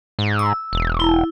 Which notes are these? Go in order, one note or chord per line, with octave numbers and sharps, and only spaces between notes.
G#2
E6
E1
E4